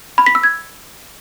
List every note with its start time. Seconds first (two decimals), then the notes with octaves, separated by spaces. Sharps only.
0.18 B5
0.26 B6
0.35 E6
0.43 G#6